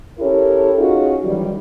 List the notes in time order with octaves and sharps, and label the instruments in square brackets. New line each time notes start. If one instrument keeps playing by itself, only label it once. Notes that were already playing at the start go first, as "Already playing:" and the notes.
[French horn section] C#4 E4 G4 A4 A#4 C#5
C#4 D#4 F4 F#4 G#4
D#3 E3 F#3 G3